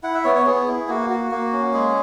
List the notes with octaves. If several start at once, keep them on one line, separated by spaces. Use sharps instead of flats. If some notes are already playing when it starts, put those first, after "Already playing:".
E4 F#5
E5
B3 C#5
C#5
B3 G#4
E4
A#3 F#4
F#4
A#3
C#4
G#3 G#4